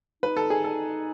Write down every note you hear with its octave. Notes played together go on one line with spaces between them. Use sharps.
D#4 B4
A4
G#4
A4